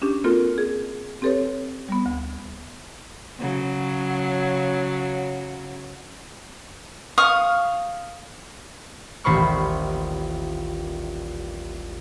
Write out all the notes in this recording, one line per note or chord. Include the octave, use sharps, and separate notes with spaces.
C#4 D4 G4
A#3 C4 F4 F#4 A4 A#4
G#4
C4 G4 A4 B4 C#5
G3 B3
D2
C#3 F#3
F5 C#6 D#6
D#1 A1 C5 B5 C#6 F6